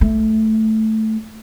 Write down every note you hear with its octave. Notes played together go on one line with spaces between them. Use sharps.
A3